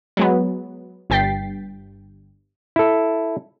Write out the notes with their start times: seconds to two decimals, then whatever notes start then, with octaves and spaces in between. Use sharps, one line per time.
0.17 F#3 G#3 B3
1.10 G1 G2 G5 A6 B6 C7
2.76 E4 A4